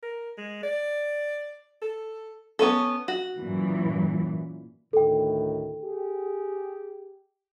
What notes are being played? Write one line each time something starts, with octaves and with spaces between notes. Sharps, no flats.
A#4
G#3
D5
A4
B3 C#4 A4
F#4
F#2 A#2 E3
D2 A2 D#3 A4 G5
G4 G#4